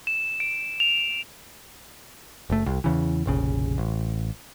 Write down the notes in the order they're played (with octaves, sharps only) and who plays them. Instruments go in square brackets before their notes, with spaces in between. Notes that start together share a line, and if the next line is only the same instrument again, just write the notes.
[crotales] E7
D7
F7
[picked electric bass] F#1 A3
C2
E2 C#3 E3
F1 A#1 C#3
A1